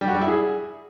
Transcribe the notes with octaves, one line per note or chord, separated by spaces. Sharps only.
G3
F#4
G3
E4
G#4